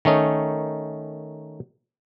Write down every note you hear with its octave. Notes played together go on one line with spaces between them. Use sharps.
D#3 A3 C#4 D#4